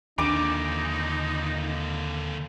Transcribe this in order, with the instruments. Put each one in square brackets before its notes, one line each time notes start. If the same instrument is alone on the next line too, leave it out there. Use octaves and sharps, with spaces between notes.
[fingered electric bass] D#2 D4 [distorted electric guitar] A#2 D3 [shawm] D#4 [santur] D6